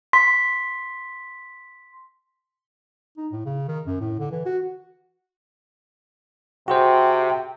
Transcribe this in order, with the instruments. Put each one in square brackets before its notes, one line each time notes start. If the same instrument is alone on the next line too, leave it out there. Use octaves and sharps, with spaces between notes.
[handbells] C6 B6
[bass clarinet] D#4
A2
C#3
D#3
F#2
A2
D3
E3
F#4
[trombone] C3 [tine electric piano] F#4 G#4 C5 [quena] G5